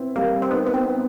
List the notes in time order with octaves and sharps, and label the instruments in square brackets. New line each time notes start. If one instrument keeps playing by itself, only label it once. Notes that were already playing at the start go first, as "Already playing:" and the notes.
Already playing: [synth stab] B3 [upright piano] C4 E4
[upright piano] G3 [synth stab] A#3
[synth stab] C4
[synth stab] B3 [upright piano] D#4
[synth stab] B3
C4
[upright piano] B3